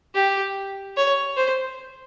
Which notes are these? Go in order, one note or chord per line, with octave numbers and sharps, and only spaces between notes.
G4
C#5
C5